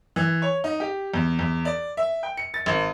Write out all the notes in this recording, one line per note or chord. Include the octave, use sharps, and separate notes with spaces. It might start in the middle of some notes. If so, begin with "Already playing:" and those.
E3
C#5
D#4
G4
E2
E2
D5
E5
G5
C#7
A6
G#1